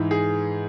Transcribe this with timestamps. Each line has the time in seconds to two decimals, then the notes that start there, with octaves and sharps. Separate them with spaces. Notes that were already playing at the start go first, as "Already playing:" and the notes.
Already playing: G#2 E3
0.11 G#4